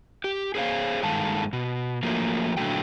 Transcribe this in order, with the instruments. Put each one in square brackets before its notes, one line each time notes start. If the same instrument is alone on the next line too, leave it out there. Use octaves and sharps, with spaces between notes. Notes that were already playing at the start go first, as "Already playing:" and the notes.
[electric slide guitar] G4
G#4 C5 C#5 F5
G2 D#3 G#3 A4 F5 A5
B2
F3 F#3 A3 A#3
A#2 D3 F#3 A3 G#4 G5